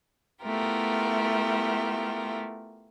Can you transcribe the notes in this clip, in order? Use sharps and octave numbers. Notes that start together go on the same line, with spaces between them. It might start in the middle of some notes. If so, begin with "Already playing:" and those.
A3 B3 E4 F4 G4 A#4